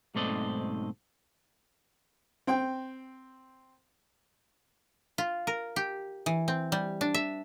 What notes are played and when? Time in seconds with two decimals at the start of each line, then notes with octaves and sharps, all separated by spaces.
0.15 B1 G#2 A3 C4 D5 D#5
2.47 C4 G5
5.18 F4
5.47 A#4
5.76 G4
6.26 E3
6.48 C4
6.72 G3
7.01 D4
7.14 E5